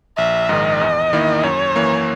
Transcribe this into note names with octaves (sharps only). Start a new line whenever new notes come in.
A#1 E5
G#2 D#3 D#5
E2
D#3 A#3 E4
F#2 C#5
E3 A#3